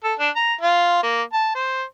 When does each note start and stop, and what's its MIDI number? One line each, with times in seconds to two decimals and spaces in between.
0.04 0.14 69
0.19 0.30 62
0.36 0.54 82
0.61 1.03 65
1.03 1.22 58
1.33 1.52 81
1.55 1.83 72